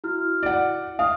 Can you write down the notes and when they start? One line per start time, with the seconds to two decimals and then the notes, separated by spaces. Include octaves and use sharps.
0.04 E4 F#4 F6
0.43 D5 F#5
0.99 F5 D#6